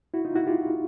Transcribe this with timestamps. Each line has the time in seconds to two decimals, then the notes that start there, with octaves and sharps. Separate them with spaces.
0.14 E4 F#4
0.25 D#4 F4
0.36 E4 F#4
0.47 F4 G4